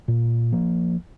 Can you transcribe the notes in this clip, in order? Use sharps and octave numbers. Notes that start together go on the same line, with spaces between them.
A#2
F3 A#3